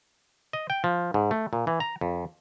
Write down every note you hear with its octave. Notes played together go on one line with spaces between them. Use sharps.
D#5
G5
F3
G#2
A3
A#2
E3
A#5
F2